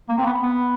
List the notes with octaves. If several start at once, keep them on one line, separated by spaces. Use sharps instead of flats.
A#3
C4
B3
B3